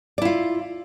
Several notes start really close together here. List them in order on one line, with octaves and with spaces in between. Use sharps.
D5 E4 F4